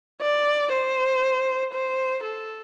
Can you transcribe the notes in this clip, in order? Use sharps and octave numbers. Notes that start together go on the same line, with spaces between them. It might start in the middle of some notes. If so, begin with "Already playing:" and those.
D5
C5
C5
A4